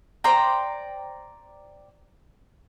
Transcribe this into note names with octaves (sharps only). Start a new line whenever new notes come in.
C5 D5 G5 A#5